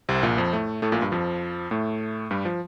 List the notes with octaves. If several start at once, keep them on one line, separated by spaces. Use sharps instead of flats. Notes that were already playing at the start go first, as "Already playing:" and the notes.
C2 C3
A#1 A#2
F2 F3
A2 A3
A2 A3
A#1 A#2
G2
F2 F3
A2 A3
G2 G3
F3